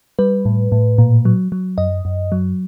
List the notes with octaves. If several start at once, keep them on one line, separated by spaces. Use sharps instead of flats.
G3 B4
A2
A2
A#2
F#3
F#3
F#2 D#5
F#2
F#3